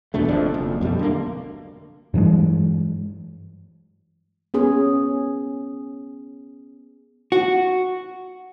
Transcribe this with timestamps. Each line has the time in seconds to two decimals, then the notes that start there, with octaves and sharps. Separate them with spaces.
0.14 E2 B2 D3 A3
0.28 F#1 F2 F3 D4
0.54 F#1
0.81 F2 B2 G3 A3
0.99 D3 A#3
2.14 G2 E3 F#3 G#3
4.54 B3 C#4 G#4
7.32 F#4